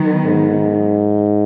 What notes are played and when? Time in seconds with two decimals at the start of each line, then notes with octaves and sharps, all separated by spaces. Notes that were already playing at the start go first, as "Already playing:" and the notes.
Already playing: D#3 F#3 B3
0.25 G#2